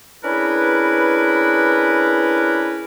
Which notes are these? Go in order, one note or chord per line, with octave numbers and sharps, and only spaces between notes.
C#4 D4 E4 G#4 A#4 B4